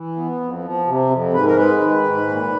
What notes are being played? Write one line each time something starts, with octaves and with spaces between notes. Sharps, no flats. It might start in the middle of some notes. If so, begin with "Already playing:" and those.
Already playing: E3
B3
F2
F3
C3
F2
G#2 B4
A#4
G#3 B4
D#3
G#2
A#2